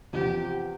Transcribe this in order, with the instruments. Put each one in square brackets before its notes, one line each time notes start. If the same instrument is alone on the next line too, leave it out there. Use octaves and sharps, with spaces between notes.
[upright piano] E2 C3 F3 [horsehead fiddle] G4